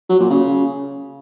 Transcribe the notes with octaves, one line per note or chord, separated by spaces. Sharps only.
F#3
A#2
C#3